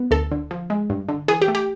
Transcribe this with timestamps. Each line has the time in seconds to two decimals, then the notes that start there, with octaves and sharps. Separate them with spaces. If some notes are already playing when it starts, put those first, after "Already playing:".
Already playing: B3
0.11 D2 A4
0.31 D3
0.51 F3
0.70 G#3
0.90 G2
1.09 D3
1.28 E3 G#4
1.42 G4
1.48 A3
1.55 G4